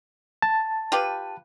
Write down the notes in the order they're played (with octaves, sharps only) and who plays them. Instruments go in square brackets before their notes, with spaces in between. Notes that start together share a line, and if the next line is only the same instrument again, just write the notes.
[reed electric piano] A5
[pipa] F4 G4 B4